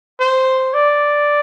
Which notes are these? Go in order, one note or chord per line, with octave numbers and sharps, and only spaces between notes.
C5
D5